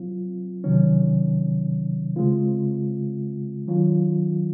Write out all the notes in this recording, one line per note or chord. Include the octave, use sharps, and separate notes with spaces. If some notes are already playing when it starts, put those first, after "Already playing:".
Already playing: F#3 C4 F4
C3 D#3 F#3 C#4
C#3 G#3 C4 F4
D#3 F#3 C#4 F4